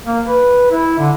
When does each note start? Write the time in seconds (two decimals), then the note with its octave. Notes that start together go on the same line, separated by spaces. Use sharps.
0.06 A#3
0.28 B4
0.72 E4
0.99 D3